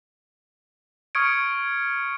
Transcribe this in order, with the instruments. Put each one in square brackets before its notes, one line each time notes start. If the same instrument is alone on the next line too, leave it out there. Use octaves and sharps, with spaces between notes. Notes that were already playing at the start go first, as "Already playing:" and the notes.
[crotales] C#6 D#6 F6 G#6 C#7 D7